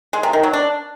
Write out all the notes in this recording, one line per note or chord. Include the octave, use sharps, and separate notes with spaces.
G#3
C3
D#3
F#3
D4